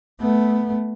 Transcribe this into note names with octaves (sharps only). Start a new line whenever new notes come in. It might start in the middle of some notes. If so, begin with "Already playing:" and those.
A3 B3